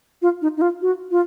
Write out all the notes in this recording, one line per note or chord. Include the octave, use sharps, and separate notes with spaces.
F4
D#4
D#4
F4
F#4
F4